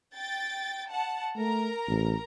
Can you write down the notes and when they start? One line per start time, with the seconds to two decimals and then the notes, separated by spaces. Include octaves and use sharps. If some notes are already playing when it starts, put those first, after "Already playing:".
0.15 G5 A6
0.88 F#5 A5
1.36 A3 A#4 A#5
1.88 A1